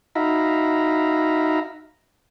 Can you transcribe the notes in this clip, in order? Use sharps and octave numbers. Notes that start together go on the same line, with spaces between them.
D#4 F#4 E5 F5 A#5 B5